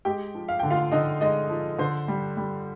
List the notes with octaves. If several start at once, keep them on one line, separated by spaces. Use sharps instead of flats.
G#3 G4 G5
F3
F5
D3 G5
F4 F5
D3 D#4 D#5
G#3 D#4 D#5
F3
D3 C5
G3
G3